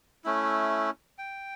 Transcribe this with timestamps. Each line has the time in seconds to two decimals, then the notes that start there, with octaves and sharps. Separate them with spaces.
0.25 A3 C#4 E4
1.18 G5